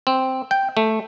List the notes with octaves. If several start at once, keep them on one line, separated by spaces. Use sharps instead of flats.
C4
G5
A3